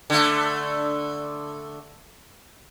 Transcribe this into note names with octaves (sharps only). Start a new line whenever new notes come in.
D3 A3